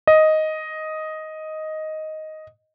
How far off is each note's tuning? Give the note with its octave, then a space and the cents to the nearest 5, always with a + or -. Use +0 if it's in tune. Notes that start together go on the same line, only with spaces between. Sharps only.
D#5 +5